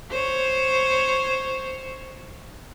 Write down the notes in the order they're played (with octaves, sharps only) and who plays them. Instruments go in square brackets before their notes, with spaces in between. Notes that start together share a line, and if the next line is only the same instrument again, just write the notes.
[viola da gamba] C5 C#5